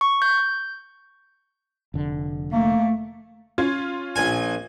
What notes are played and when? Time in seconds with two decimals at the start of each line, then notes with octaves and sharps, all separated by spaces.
0.01 C#6
0.22 G6
1.94 F1 D3
2.52 A3 A#3
3.58 C#4 F4 G#6
4.16 A#1 G#5